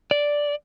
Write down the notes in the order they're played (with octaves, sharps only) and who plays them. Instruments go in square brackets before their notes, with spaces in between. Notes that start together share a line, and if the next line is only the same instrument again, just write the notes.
[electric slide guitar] D5